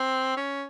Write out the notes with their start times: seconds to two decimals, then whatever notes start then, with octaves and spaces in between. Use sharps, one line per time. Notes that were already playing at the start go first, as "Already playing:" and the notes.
Already playing: C4
0.37 C#4